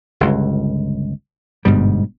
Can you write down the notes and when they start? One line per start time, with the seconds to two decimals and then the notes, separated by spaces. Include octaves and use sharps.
0.20 G1 C#2
1.65 G1 G#2 B2 G3